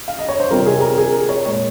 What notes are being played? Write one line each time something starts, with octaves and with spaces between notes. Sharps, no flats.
F5
D#5
C#5
C5
C3 D#3 G3 C4 F4 A#4
G#4
A#4
G#4
A#4
C#5
A#2 G#3 C#5